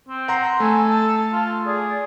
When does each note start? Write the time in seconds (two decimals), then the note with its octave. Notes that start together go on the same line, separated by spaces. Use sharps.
0.09 C4
0.28 F#5 A#5 C6
0.60 A3 A4 G#5
0.88 A5
1.33 F4
1.66 G#4 D5